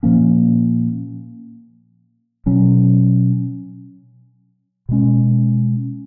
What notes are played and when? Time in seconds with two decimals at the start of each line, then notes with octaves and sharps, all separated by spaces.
0.03 A#2 F3 A#3 C#4
2.46 B2 F#3 C#4
4.89 B2 G#3 C#4